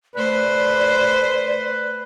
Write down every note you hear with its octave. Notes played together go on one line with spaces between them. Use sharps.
A3 B4 C5 D5